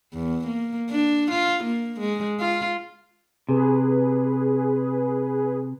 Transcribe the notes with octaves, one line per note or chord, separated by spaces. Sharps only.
E2
A#3
D4
F4
A#3
G#3
F4
C3 G#4 B4